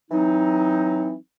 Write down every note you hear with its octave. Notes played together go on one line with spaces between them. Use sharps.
E3 F#3 C4 D#4